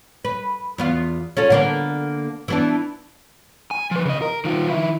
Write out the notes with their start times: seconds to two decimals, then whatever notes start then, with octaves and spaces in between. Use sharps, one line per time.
0.25 B4
0.78 E2 B3 F4
1.37 C#4 F4 A4
1.50 D3 A#3 B3
2.48 E3 B3 D4
3.71 G#5
3.91 F3 B4
4.05 C#3 D#5
4.22 A#4
4.45 D#3 F4
4.69 D#3 E4